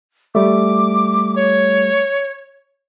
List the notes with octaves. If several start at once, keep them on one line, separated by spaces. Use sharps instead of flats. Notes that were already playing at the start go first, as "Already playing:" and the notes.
G3 A3 D6
C#5